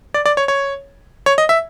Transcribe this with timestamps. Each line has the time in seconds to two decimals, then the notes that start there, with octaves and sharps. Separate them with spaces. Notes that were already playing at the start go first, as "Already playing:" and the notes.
0.14 D5
0.26 D5
0.37 C#5
0.48 C#5
1.26 C#5
1.38 D#5
1.49 E5